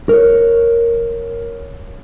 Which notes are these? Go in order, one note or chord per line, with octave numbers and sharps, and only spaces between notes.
A#4 C#5